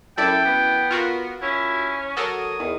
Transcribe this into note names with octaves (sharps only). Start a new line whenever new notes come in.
F#2 E4 A4 D5 G5
B3
F4 F#4 A#4
C#4 E4
F#3 F#4 A4 A#4 D#6
E2 D#3